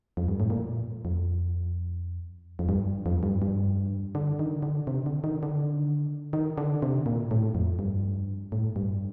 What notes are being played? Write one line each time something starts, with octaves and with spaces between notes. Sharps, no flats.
F2
G2
A2
A#2
F2
F2
G2
F2
G2
G2
D3
D#3
D3
C3
D3
D#3
D3
D#3
D3
C3
A#2
A2
F2
G2
A2
G2